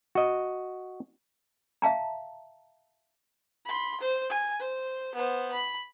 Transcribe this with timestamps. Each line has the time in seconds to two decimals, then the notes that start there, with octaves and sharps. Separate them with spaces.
0.15 F#4 D#5
1.82 E5 F5 A5 A#5
3.66 B5 C6
4.01 C5
4.30 G#5
4.60 C5
5.15 B3 C5
5.52 B5